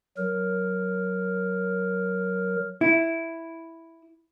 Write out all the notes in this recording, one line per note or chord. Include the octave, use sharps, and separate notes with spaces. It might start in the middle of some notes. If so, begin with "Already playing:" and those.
F#3 A#4
E4